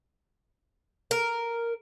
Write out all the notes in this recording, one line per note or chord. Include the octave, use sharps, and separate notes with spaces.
A#4